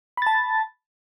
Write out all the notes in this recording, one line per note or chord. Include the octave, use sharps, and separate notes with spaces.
A5 B5 A6